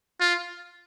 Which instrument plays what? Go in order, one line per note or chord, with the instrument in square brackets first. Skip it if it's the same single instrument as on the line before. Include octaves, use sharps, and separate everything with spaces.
[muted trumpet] F4